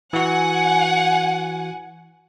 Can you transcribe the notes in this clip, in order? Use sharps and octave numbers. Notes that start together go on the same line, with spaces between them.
E3 F#4 F#5 G#5